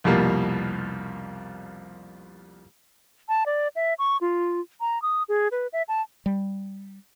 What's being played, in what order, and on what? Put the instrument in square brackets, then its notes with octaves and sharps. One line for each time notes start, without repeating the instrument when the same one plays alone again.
[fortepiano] C2 F2 B2 G3 A#3
[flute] A5
D5
E5
C#6
F4
A#5
D#6
G#4
B4
E5
A5
[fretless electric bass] G3